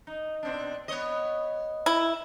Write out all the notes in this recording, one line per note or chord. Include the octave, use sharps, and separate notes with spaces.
D#4
B2 C4 D4
B3 C#5 D#5
E4